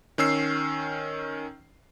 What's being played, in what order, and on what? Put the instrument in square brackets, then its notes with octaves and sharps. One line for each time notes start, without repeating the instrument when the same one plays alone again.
[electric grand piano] D#3 C#4 E6 C7